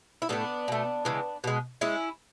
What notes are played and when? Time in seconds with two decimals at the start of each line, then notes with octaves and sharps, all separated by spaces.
0.22 E4
0.29 A2 F#3 A3 B3 D4
0.68 B2 A3
1.05 C#3 E3 G#3
1.44 B2 G#3
1.81 G#3 C#4 E4